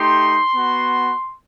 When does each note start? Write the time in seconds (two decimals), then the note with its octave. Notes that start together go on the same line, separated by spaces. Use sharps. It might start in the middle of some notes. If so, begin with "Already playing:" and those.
Already playing: A3 D#4 G4 C6
0.55 B3 F#4